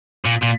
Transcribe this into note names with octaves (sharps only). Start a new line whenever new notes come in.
A#2
A#2